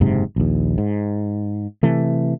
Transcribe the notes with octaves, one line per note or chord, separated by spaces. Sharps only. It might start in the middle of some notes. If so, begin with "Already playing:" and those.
F#1 G#2 C3
A#1 D#2
G#2
C3 E3 A3